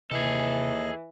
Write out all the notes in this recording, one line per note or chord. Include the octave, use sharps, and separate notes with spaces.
D#2 C3 E3 G#4 A4 D#5